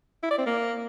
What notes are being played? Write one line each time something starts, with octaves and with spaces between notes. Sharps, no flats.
E4
D5
C4
A#3